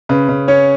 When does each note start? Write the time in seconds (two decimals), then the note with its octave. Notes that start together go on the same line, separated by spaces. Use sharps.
0.09 C#3 B4
0.29 C#3
0.48 C#4 C#5